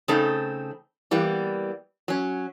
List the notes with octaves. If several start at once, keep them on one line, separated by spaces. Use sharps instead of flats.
C#3 A3 C4 D#4 A4
E3 G3 A#3 B3
F#3 C#4